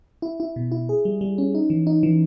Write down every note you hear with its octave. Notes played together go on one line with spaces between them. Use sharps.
E4
E4
B2
E4
G#4
G3
G3
C#4
D#4
E3
D#4
E3